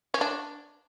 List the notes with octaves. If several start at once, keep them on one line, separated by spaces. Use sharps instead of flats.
C#4
D4